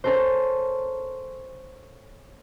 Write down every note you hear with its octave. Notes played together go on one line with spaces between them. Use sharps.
C#4 A4 A#4 C5